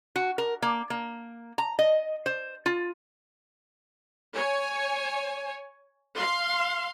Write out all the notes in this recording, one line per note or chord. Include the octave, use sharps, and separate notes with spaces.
F#4
A#4
A#3
A#3
A#5
D#5
C5
F4
C#5 G#5
F5 C6